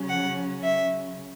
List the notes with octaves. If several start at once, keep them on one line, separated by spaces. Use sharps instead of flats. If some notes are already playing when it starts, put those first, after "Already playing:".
Already playing: C#3 F#3 C#4
F#5
E5